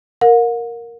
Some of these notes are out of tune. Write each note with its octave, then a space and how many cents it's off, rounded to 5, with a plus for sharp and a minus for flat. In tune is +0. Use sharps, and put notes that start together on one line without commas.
A#4 +0 F#5 -45